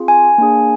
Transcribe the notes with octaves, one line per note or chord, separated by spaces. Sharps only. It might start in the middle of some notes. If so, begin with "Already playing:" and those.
Already playing: C4 F4 G#4
G#5
A#3 D4 G#4